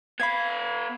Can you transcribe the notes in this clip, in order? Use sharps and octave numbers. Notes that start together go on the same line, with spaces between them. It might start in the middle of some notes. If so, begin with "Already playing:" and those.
B3 F5 B5 G#6